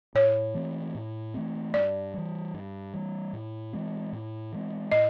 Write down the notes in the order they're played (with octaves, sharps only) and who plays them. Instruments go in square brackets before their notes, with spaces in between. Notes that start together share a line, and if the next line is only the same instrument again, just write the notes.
[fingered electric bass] A2 [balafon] C#5
[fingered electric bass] E3 A3 C4
A2
E3 A3 C4
[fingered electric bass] G2 [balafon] D5
[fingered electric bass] E3 G3
G2
E3 G3
A2
E3 G#3 C4
A2
E3 G#3 C4
[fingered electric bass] A2 [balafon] D#5